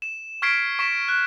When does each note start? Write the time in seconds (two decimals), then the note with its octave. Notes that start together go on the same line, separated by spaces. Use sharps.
0.02 E7
0.42 C#6 F6 G#6 B6 C7 D7
0.79 C#6 B6 E7
1.08 F#6